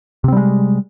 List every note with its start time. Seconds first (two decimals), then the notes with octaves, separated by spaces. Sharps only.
0.24 C3
0.28 C4
0.32 G3
0.37 G#3